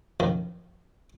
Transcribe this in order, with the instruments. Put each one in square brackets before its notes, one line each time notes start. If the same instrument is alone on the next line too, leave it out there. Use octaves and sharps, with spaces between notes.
[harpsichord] F#2 A2 D#3 F3